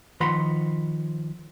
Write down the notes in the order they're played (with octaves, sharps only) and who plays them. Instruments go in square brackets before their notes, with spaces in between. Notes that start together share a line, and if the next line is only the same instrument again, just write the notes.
[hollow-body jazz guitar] D#3 F3 F#5 B5 C6